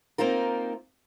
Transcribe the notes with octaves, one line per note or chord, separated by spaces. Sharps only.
A#3 C4 D#4 F4 A#4